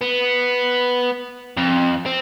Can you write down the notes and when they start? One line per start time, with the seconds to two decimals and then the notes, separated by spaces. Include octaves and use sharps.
0.01 B3
1.57 F2
2.06 C4